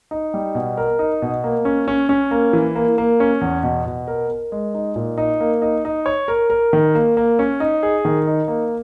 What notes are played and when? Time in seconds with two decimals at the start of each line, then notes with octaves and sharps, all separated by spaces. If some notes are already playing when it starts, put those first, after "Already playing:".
0.11 D#4
0.34 G3
0.55 B2
0.77 A#4
0.99 D#4
1.22 B2
1.44 A#3
1.65 C#4
1.88 C#4
2.09 C#4
2.31 A#3
2.53 E3
2.76 A#3
2.98 A#3
3.20 C#4
3.41 E2
3.63 B2
3.86 B2
4.07 A#4
4.31 A#4
4.52 G#3
4.74 D#4
4.96 A#2
5.18 D#4
5.40 A#3
5.62 D#4
5.85 D#4
6.06 C#5
6.28 A#4
6.50 A#4
6.73 D#3
6.95 A#3
7.17 A#3
7.39 C#4
7.60 D#4
7.83 G#4
8.05 D#3
8.27 D#4
8.48 A#3